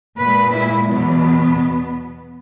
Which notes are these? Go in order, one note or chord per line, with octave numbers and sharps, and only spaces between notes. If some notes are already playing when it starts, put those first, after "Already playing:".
A#2 G#3 B4
E4
E2 B2 F#3 B3